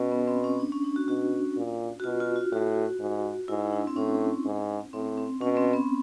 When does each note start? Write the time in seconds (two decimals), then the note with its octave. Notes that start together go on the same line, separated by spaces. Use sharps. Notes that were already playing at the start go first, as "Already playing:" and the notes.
Already playing: B2 C#4
0.12 B3
0.28 C4
0.44 C#4
0.60 D4
0.72 C#4
0.84 D4
0.96 F#4
1.08 B2 F#4
1.56 A#2
2.00 F#4
2.04 B2 F4
2.20 F4
2.36 F4
2.52 A2 F#4
3.00 G#2
3.48 G#2 E4
3.73 D4
3.87 C4
3.96 A2 C#4
4.45 G#2
4.93 A2 C4
5.18 C4
5.41 B2 C#4
5.57 C4
5.73 B3